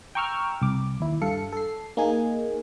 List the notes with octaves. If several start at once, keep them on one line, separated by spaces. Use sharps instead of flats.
G5 A#5 C#6 E6 F6
C2 D6
D#2 E4
G2 A4 F5 C#7
A4 C7
A#3 D#4 G#4 G#5